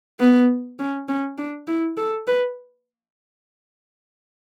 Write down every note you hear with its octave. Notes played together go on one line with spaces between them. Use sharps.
B3
C#4
C#4
D4
E4
A4
B4